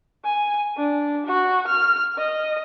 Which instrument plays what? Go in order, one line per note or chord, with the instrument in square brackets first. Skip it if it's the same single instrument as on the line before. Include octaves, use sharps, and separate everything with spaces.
[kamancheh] G#5
D4
F#4
F6
D#5